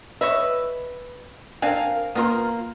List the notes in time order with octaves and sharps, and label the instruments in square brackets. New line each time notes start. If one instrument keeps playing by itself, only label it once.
[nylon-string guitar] B4 [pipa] C#5 D#5 E5
[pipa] C4 D4 G#5 [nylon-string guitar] A#4 F5
[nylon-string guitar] A#3 F4 [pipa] B3 A#4 C6